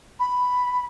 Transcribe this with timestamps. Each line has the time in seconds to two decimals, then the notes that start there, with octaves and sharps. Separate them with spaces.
0.19 B5